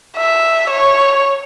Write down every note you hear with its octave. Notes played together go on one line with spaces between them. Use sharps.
E5
C#5